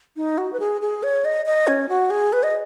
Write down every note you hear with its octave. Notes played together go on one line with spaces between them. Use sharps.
D#4
F#4
B4
G#4
G#4
C#5
D#5
D#5
C#4
F#4
G#4
B4
D#5